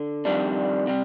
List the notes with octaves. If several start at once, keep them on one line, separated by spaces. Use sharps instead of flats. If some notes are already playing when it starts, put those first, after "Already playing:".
Already playing: D3
F2 D#3 G3 D4
C3 G3